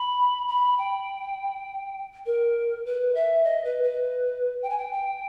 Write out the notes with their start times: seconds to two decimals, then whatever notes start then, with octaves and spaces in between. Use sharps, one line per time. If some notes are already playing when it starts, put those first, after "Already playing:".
Already playing: B5
0.48 B5
0.78 G5
2.26 A#4
2.86 B4
3.15 E5
3.44 D#5
3.65 B4
3.83 B4
4.62 G5
4.70 G#5
4.78 G5
4.92 G5